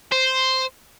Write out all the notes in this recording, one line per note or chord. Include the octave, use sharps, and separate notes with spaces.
C5